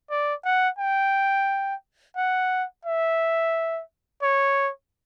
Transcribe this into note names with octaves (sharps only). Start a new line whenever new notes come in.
D5
F#5
G5
F#5
E5
C#5